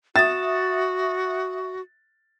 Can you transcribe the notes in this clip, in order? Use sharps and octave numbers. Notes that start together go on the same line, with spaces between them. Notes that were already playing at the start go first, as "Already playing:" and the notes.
F#4 E5 D#6 A6